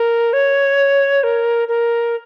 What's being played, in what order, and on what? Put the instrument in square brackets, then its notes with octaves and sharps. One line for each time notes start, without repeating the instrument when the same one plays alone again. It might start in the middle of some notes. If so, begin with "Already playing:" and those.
Already playing: [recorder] A#4
C#5
A#4
A#4